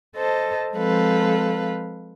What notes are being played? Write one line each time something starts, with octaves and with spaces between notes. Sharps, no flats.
A4 C5 D#5 A5
F3 G#3 C4 A4 B4 F5